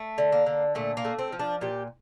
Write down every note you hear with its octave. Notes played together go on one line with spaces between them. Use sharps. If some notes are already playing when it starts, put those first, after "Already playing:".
Already playing: A3
D3
A#3
D3
A#2 A3
A#3
A3
C4
F3
D4
A#2 G4